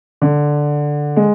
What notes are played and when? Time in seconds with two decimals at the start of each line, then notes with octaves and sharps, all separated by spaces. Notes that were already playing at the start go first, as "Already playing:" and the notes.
0.22 D3
1.16 G#3